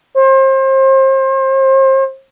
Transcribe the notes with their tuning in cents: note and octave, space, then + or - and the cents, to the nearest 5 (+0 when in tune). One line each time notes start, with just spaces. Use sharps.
C5 +35